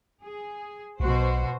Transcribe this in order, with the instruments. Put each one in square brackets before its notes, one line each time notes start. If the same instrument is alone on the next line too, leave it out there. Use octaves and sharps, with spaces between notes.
[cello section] G#4
[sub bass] B1 [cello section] B2 F#4 C5